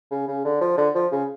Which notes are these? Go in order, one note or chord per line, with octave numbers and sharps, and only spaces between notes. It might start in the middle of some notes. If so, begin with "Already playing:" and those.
C#3
C#3
D3
F3
D3
F3
C#3